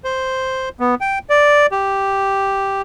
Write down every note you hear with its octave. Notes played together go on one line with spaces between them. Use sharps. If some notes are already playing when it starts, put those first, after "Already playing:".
C5
B3
G5
D5
G4